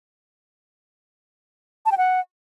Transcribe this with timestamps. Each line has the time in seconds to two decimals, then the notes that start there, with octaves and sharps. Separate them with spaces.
1.86 A5
1.92 G5
1.97 F#5